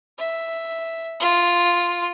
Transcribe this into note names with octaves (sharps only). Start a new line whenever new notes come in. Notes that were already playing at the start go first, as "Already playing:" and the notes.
E5
F4